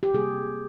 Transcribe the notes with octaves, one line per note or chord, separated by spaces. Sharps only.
G4
C3 G3 A#3 G#4